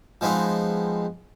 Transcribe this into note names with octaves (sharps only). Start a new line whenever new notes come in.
F3 G#3 B3 C4 D#4